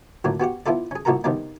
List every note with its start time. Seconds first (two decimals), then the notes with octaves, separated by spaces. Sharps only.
0.24 A1 A#2 D3 F#3 A3
0.40 B3 F#4 G4 F#5
0.66 B3 E4 F4 A4 D5
0.91 C#4 G#4
1.05 C2 A#2 F#4 A4 A#4 A#5
1.24 C3 D#3 G3 B3 C4 D4